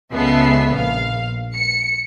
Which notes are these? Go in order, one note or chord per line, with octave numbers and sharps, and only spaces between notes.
C#2 C#3 B3 A4 E5 C7
A#1 F5
C#7